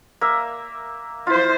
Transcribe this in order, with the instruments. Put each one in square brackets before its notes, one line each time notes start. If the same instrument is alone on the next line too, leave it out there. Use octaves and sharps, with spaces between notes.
[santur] A#3 E5
[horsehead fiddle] E4 C5 [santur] F4